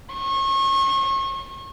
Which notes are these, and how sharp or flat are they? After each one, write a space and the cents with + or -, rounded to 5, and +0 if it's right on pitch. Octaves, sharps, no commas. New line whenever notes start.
C#6 -35